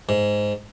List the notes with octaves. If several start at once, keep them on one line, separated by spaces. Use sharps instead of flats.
G#2